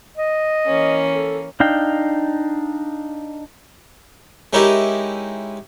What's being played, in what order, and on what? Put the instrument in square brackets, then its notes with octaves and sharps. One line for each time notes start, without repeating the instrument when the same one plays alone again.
[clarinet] D#5
[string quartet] E3 A#3 C#4
[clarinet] A4
[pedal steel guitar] D4 D#4 F5 G5
[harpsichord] G#3 C#4 D#4 E4 G4 A#4